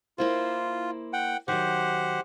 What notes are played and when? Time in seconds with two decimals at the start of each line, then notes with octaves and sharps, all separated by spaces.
0.18 A#3 E4 F4 C5
1.13 F#5 G5
1.48 D#3 F#3 G4 C5 F#5